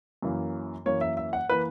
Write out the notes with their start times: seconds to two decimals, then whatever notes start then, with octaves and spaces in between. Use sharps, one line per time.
0.22 F#2 E3 A#3
0.86 F#2 E3 A#3 C#5
1.01 E5
1.17 E5
1.33 F#5
1.49 E3 A#3 B4